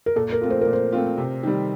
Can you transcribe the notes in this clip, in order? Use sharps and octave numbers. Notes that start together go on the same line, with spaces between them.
A#4
A#2 A4
A#4
A3 C4 F4
C5
A#4
A#2
C5
A3 C4 F4
C3
D#3 G3